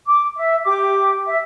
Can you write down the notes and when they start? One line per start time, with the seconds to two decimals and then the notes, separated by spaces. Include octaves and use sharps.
0.05 D6
0.35 E5
0.64 G4 D6
1.26 E5